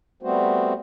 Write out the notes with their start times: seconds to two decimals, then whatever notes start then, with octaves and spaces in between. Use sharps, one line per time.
0.23 G3 A3 B3 C4 F#4 C5